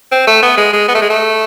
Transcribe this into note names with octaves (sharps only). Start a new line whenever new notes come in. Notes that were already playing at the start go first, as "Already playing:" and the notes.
C4
A3
B3
G#3
G#3
B3
A3
G#3
A3